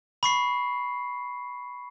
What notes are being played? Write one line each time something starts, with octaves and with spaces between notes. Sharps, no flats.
B5 C#6 C7